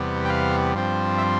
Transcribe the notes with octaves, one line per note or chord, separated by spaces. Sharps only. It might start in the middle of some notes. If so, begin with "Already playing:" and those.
Already playing: E2 C3 G3 B3
G5
F5
G2 F3 C4
E5